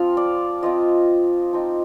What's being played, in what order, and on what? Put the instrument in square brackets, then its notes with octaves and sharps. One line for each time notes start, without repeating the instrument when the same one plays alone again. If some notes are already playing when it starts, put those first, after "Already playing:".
Already playing: [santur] F3 C4 F4 F5
D5
F3 C4 F4 D#5
F3 C4 D#4